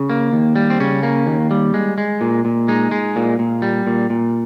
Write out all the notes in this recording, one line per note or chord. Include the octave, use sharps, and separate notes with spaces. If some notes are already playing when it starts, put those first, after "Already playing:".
Already playing: C#3
A#3
D#2
G3
C4
C#3 C#4
A#3
D#2
G3
G#3
G#3
A#2
A#2
G#3 D#4
G#3
A#2
A#2
G3
A#2
A#2